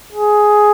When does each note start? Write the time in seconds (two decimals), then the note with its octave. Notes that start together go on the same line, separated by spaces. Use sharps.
0.13 G#4